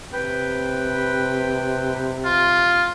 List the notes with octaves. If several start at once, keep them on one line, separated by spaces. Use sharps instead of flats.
C3 B4 G5
F4